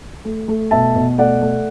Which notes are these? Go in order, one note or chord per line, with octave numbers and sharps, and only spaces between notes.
A3
A3
B2 E5 A5
B2
A3 D5 F#5
A3